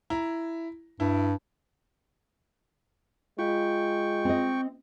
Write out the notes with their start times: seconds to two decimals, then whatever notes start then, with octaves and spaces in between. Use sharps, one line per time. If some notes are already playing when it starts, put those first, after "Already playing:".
0.10 E4 A#5
1.00 G2 E4
3.39 G#3 F4 G5 C#6
4.25 C4 D#5